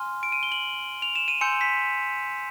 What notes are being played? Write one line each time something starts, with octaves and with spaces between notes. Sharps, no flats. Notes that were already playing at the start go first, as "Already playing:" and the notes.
Already playing: G#5 C6 F6
D7
D#7
G7
F#7
F7
E7
D#7
G#5 C6 E6 G6 C#7
B6